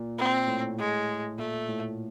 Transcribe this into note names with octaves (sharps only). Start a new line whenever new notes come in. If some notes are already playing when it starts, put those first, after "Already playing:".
Already playing: A#2
C4
A2
G#3
A#2 A3
A2